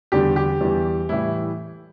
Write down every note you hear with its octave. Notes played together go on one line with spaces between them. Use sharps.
E2 D3 G3 G4
G4
E2 E3 G3
A2 E3 G3 E4